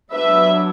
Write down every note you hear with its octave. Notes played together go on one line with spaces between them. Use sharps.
F#3 B3 D4 B4 E5